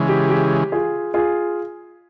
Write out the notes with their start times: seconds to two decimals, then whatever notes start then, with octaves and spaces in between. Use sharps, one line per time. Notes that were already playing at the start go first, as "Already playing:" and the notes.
Already playing: C#3 E3 G#3
0.09 G4
0.30 G4
0.72 F4 G#4
1.14 F4 G#4